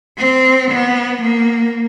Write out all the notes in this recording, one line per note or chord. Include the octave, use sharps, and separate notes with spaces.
C4
B3
A#3